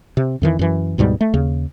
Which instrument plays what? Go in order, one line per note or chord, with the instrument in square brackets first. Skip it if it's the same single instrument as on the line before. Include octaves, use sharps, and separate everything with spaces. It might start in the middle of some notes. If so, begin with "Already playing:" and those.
[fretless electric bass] C3
F2 D#3 E3
F#2 E3
D2 G#2 B2 G3
A3
D#2 C#3